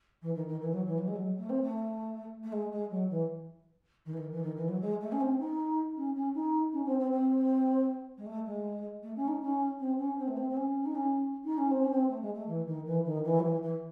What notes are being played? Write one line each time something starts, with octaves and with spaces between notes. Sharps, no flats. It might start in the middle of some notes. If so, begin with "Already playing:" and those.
E3
D#3
D#3
E3
F#3
E3
F#3
G#3
F#3
A3
C4
A3
A3
G#3
G#3
F#3
E3
D#3
E3
D#3
E3
D#3
E3
F#3
G#3
A3
C#4
C4
D#4
C#4
C#4
D#4
C#4
C4
C4
C4
G#3
A3
G#3
A3
C#4
D#4
C#4
C4
C#4
C4
A3
C4
C4
C#4
D#4
C#4
D#4
C#4
C4
C#4
C4
A3
G#3
A3
E3
D#3
E3
D#3
E3
F#3
E3
E3